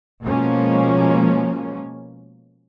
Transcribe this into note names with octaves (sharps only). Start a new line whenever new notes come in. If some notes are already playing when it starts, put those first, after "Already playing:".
B2 F3 G#3 A#3 C#4